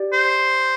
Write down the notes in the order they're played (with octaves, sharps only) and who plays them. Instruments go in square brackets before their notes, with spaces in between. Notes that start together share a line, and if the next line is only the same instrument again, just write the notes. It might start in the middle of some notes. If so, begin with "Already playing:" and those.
Already playing: [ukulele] G4 D5
[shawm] C5